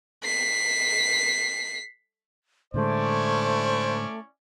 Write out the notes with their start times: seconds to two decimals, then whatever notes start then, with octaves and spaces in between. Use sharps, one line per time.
0.23 B6 C7
2.74 A2 D3 G#3 A3 C#4 E4 C5 D5